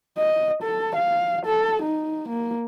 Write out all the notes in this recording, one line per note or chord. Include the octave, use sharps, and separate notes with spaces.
D#5
A4
F5
A4
D#4
A#3